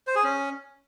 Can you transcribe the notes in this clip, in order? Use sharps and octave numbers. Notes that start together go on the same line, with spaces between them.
C5
G#4
C#4